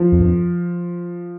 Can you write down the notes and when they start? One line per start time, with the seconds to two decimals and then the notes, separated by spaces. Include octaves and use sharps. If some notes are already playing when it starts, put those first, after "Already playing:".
Already playing: F3
0.12 F2
0.20 G2
0.26 F2